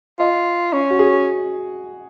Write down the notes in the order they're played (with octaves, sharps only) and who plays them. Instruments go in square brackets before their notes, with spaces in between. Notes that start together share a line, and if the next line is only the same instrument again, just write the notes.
[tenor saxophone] F4 [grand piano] D#5
[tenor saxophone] C#4
[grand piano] F#4
G#4